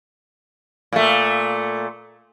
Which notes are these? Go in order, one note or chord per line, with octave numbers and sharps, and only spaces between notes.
A#2 A3